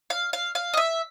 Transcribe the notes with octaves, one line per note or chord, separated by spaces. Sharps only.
F5
F5
F5
D#5
E5